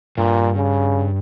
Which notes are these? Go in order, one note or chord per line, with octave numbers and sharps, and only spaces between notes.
G2 A#2
C#3